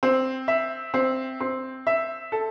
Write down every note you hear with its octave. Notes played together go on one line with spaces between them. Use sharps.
C4
E5
C4
C4
E5
A4